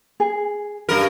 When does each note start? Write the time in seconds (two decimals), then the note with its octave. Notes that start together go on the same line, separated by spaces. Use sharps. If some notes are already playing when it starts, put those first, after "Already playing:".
0.20 G#4
0.89 G2 A#4